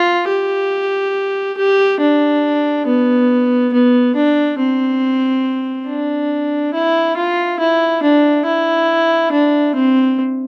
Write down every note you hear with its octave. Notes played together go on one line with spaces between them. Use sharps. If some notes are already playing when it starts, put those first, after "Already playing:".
Already playing: F4
G4
G4
D4
B3
B3
D4
C4
D4
E4
F4
E4
D4
E4
D4
C4